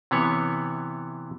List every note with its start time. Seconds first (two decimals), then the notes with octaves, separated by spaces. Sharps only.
0.11 C3 E3 B3 C#5